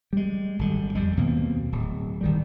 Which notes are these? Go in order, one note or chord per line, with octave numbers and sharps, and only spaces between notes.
G3 G#3
G#1 D3 G3
F2 G3 G#3
D#2 B2 A#3 C4
D1
G1 D#3 G3